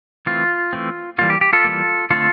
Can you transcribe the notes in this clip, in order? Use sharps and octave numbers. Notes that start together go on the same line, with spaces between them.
E3 A3 C4 F4
E3 A3 C4
E3 G3 A#3 F4
G4
G4
F4 A4
E3 G3 A#3
D3 A3 C4 F4 A4